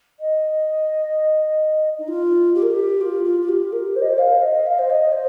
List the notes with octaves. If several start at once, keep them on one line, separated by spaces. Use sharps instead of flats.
D#5
D#4
F4
G4
A#4
G4
F4
F4
F4
G4
A#4
C5
D#5
C5
F5
D#5
F5
C5
D#5
C5